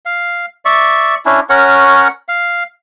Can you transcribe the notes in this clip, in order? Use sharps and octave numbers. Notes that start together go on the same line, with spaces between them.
F5
D5 E5 C#6
C#4 D4 E4
C#4 A#4 C#5 F#5
F5